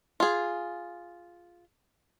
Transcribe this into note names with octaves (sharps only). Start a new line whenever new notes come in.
F4 G#4